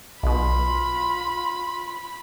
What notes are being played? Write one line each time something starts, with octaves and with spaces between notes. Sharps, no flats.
B1 B2 F4 B5